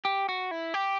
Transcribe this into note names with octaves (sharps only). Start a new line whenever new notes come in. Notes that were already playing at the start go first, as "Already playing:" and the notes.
G4
F#4
E4
G4